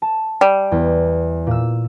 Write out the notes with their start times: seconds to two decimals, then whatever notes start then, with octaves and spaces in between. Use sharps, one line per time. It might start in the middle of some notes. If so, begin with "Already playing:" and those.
0.02 A5
0.41 G3
0.72 E2
1.47 A#2 E6